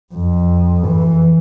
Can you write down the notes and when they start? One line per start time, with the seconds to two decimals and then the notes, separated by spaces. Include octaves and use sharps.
0.14 F2
0.85 E3